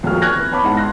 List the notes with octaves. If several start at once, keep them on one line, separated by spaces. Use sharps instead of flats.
D#1 F2 A#3 F#4 G#4 F6
G#5 C#6 F6 F#6 G#6 A#6
E3
E3 B3 C#5 A5 B5 D6
G#2 G#3 F#5 A5
C6 F#6 A#6